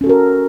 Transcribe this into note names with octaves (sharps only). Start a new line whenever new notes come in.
C#4 F#4 A4 A#4